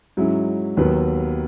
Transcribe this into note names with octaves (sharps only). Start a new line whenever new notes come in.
G#2 F#3 C#4 E4
D#2 D#3 F#3 B3 B4